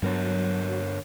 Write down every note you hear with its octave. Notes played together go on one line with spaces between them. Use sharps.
G2 D3 F#3 B3 D4 A#4 C#5